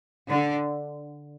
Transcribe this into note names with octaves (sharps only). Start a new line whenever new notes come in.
D3